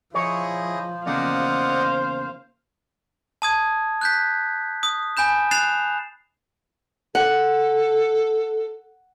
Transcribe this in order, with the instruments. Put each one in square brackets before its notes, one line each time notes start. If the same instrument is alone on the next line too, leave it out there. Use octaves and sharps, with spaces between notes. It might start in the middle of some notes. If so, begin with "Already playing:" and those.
[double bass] F3 [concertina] E4 G#4 D#5 [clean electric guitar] C#5
[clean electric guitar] E2 C#3 A#3 [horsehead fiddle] C5 F5 [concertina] D5 D#5 F#5
[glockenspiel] A5 D#6 G#6
F#6 G6 B6
D#6
G#5 B5 G6 E7
F#6 A6 C7 E7 F7
[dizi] A4 [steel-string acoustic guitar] F#5